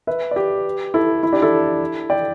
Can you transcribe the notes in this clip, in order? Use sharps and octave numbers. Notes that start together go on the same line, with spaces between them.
B4 E5
D5
G4 B4
E4 A4
E4
D4 G4
E4 A4
D5 G5